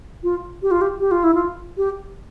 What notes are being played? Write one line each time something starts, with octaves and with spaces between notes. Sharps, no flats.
F4
G4
F4
G4
G4
F4
E4
F4
G4